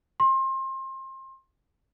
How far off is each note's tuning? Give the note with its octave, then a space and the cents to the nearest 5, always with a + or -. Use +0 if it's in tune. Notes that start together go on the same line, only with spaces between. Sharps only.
C6 +30